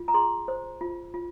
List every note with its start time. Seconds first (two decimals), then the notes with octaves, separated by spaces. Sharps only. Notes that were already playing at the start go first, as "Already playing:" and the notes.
Already playing: F4
0.08 A#5
0.14 G#4 C6
0.48 C5
0.81 F4
1.14 F4